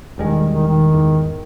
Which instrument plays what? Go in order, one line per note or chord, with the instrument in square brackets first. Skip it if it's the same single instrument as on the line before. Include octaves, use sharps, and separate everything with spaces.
[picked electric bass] E1 G3 G#3 [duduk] D#3
[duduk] D#3
D#3
[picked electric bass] E2 G#2